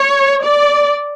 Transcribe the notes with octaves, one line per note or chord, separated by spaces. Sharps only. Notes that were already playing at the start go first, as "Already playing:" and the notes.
Already playing: C#5
D5